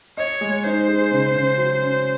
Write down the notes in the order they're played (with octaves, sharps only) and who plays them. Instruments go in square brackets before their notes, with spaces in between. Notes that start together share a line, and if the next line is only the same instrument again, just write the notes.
[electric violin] C#5 [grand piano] D#5
[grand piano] G#3
[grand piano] D#4 [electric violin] C5
[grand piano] G#4
C#3
C#3
F#3
C#4